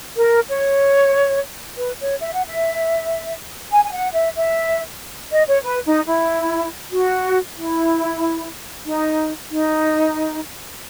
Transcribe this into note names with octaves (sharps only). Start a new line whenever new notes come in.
A#4
C#5
B4
C#5
E5
F#5
E5
G#5
G#5
F#5
E5
E5
D#5
C#5
B4
D#4
E4
F#4
E4
D#4
D#4